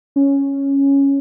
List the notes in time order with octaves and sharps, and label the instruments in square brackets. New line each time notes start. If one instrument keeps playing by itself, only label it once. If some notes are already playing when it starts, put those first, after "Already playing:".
[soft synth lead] C#4